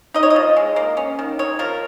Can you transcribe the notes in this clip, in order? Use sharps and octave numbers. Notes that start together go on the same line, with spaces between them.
D#4 D#5
C#5
D#5
F3
G#3
A#3
C#4
D#3
D#4 C#5
F3 A#4